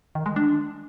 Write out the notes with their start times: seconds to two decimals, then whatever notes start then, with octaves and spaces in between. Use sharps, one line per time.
0.15 D#3
0.26 G#3
0.36 D4